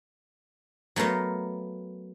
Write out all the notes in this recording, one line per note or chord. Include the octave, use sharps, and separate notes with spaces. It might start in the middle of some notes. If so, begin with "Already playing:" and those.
F#3 A3 B3 A#4 F5